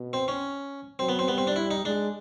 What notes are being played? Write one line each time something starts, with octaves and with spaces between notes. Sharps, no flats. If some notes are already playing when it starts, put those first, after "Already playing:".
Already playing: B2
C4
C#4
F#3 C4
B3
C4
G3 B3
C4
D4
E4
D#4
G#3 D4